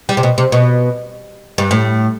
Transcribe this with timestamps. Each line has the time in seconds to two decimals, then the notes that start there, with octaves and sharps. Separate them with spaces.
0.09 G3
0.17 C3
0.23 B2
0.38 C3
0.52 B2
1.58 G2
1.71 A2